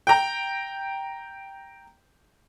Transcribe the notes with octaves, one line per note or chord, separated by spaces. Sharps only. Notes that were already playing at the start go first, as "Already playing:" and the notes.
G5 A#5